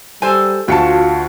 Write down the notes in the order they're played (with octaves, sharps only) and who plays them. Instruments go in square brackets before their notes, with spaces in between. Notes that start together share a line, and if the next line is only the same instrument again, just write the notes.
[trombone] G3 [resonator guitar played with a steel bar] A4 C5 G#5
[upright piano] D2 F#4 C#7 [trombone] F4 [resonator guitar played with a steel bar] G5 A5